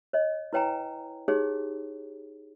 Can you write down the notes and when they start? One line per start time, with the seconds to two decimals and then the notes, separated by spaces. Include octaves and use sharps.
0.13 C#5 D#5
0.53 E4 B4 C#5 G5 G#5 A#5
1.28 D#4 G4 G#4 C#5